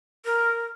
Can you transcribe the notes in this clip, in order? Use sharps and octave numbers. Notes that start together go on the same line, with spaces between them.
A#4